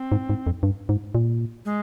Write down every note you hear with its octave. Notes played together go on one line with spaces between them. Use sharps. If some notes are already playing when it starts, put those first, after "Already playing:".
Already playing: C4
G#2
G#2
F2
G2
G#2
A#2
G#3